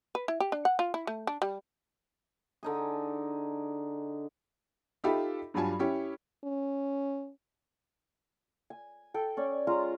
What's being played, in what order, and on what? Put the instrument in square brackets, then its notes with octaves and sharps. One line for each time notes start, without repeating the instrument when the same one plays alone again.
[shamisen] B4
E4
G4
D4
F#5
F4
E4
A3
D4
G3
[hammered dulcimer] D3 D#4 G#4
[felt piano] D#4 F4 G4 A4 E5 B5
G2 F#3 G3 F4 G#5 A5
C#4 E4 G4 C#5
[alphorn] C#4
[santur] G#5
A4 G5
C#4 D5 G#5
G#3 C#4 F4 A#5